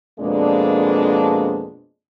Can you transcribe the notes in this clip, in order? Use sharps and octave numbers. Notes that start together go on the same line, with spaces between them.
F2 B2 G#3 A#3 D4